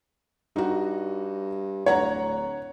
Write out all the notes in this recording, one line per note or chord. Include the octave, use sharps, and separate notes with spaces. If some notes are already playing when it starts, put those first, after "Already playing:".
G2 D#4 F#4
D1 C#5 F#5 A#5